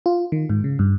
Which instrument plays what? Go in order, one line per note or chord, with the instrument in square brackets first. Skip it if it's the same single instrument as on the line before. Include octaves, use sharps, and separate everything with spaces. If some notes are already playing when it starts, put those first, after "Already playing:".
[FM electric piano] F4
D#3
G#2
C#3
G2